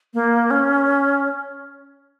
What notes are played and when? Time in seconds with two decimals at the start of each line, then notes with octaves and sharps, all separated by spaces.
0.14 A#3
0.51 C#4